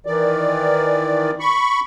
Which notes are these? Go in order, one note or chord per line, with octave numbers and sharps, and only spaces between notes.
D#3 E3 D5
B5 C#6